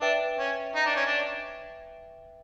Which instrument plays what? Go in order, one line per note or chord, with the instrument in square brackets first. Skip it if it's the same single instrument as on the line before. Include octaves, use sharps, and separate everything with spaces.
[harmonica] D4 [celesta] B4 E5 G5
[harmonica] C#4
D#4
D4
C#4
D4